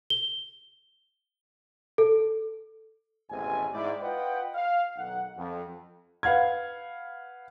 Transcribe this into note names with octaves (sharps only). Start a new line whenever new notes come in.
G7
A4
A1 D#2 G#2 B2 C4 G#5
G#2 E4 D5 G5
F4 B4 D#5 F#5 G5
F5
B1 D#3 F#5
F2
B4 F5 F#5 F6 G#6